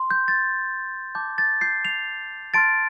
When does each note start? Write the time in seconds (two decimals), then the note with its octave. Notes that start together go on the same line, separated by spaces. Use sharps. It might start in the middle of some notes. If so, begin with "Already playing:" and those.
Already playing: C6
0.11 G6
0.28 A6
1.15 A5 D6 G6
1.38 A6
1.61 G6 C7
1.85 C7 F7
2.54 A5 C6 F6 A6 D7